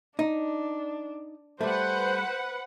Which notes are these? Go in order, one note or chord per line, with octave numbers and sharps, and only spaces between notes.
D4 D#4
G3 A3 B4 C5 F#5